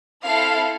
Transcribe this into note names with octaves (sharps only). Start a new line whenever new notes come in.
C4 E4 A4 F5